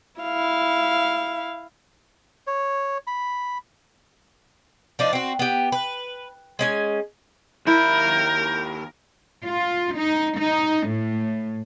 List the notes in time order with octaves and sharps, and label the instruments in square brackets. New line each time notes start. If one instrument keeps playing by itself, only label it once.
[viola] E4 F5
[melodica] C#5
B5
[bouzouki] F3 D4 D#4
C4 F#4
B3 G4
B4
G#3 C#4 G#5
[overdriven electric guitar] D#2 B5 [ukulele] E4 [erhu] A#4 [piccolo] G6
[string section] F4
D#4
D#4
A2